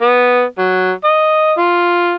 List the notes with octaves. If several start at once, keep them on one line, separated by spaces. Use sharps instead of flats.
B3
F#3
D#5
F4